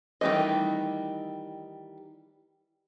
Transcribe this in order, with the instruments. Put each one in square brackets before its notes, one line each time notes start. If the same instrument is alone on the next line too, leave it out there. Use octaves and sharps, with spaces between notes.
[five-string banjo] D#3 E3 G3 A3 D#5